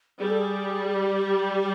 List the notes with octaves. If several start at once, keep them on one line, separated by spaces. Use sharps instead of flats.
G3 G#4
A4
G#4
G#4
G4